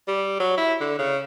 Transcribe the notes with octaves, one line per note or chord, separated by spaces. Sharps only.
G3
F#3
E4
D3
C#3